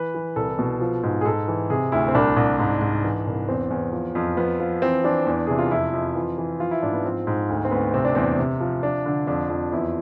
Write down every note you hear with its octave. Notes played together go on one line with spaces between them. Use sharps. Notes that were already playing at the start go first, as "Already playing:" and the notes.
Already playing: E3 B4
E3
C2 A4
B2
F3
G#2
G#4
G#2 A4
E3
C3 G#4
D2 E4
C4
C2 D4
C2
G#2
G#2
E3
C2
E2 C4
E2
F3
F2
F3 B3
F3
E3 C4
E3 D4
E2
C3 G#4
F4
F2 E4
F2
E3 F4
E3
F3 F4
E4
G#2 D4
B3
F3 C4
G#2
D2
C4
D2 B3
C3 C4
D4
E2 C4
C3
F3
F3 D4
D3
F2 D4
F2
E2 E4